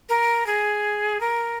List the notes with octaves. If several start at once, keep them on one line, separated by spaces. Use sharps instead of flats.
A#4
G#4
A#4